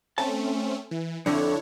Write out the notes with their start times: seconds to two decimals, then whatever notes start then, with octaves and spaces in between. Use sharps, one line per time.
0.18 A3 C4 C#4 A5
0.91 E3
1.26 F2 D3 D4 E4 C#5